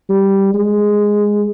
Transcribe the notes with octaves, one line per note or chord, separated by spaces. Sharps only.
G3
G#3